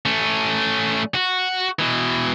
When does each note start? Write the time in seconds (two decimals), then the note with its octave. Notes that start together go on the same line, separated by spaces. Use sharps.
0.06 A3 C#4
1.15 F#4
1.79 B2 E3